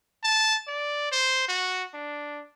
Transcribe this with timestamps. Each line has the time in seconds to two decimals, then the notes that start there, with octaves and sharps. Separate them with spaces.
0.24 A5
0.67 D5
1.12 C5
1.48 F#4
1.94 D4